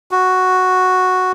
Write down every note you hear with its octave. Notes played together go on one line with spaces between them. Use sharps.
F#4